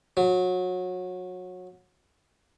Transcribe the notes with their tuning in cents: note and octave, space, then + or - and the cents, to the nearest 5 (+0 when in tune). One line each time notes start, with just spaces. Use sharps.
F#3 -25